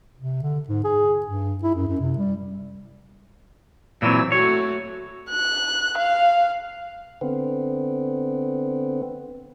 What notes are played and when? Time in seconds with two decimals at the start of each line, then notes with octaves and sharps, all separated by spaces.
0.19 C3
0.42 D3
0.69 G#2
0.84 G#4
1.26 G2
1.63 E4
1.75 F#2
1.88 F#2
2.00 C3
2.18 G3
4.02 A#2 E3 F#3 C4 E6
4.32 A3 F#4 C#5
5.30 F#6
5.98 F5
7.21 D3 B3 C4